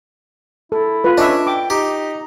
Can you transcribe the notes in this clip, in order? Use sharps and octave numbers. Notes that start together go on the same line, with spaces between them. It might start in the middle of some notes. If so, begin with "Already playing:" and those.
E4 A4
F4 B4
C#4 D4 D#5 E5
G5 D6
D#4 G4